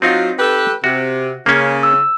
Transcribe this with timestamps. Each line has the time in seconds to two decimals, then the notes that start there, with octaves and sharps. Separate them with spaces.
0.02 F#3 C4 D#4 F4
0.39 G4 A4 B4
0.84 C3 F#4
1.46 C#3 A#3 C#4
1.83 E6